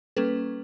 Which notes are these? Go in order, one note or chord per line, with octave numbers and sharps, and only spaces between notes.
G3 A#3 C#4 A4 B4